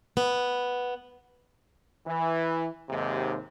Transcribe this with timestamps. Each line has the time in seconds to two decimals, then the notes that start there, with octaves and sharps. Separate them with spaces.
0.17 B3
2.07 E3
2.89 D#2 G#2 C3